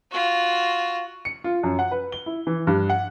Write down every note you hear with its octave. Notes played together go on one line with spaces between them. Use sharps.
F4 F#4
C#7
F4
F#2
F#5
B4
G7
E4
E3
G2
F#5